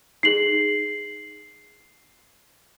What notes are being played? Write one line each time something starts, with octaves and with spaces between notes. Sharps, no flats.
D#4 G#4 C7 F#7